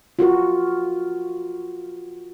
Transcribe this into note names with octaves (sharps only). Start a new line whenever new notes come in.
F4 F#4 A#4